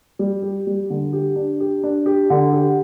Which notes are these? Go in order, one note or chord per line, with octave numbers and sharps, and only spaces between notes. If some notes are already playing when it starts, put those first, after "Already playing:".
G3
G4
G3
D3
G4
D4
G4
D4
G4
D3
G4